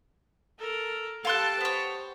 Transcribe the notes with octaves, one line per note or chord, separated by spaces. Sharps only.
A4 A#4
G4 A4 F5 G5 A5 C6 F#6
B3 C5 C#5